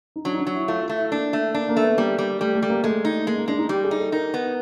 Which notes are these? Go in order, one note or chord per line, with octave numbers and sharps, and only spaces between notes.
D#4
F#3 D4
D#4
D4
F#3
E4
A3 F4
F4
A3
E4
A#3 D4
A3
A#3 D4
A#3
A3
B3
G3 A#3
G3
G3 A3
A3
G3
A#3
G#3 A3
D#4
G#3 A#3
A#3
G#3 D4
D#4
G3 G4
G#4
D#4
A4
D#4 A#4
B3